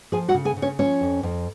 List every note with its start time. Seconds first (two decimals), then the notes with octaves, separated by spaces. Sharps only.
0.12 F3 G#4 G#5
0.28 F#4 F#5
0.34 C#3
0.45 G#4 G#5
0.57 C#3
0.62 C#4 C#5
0.79 F3 C#4 C#5
1.01 F2
1.23 F2